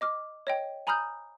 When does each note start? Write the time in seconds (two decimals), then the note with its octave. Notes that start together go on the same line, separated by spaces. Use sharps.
0.01 D#5 D6 F6
0.47 C#5 D#5 G5
0.87 G#5 A#5 B5 D#6 F6 G6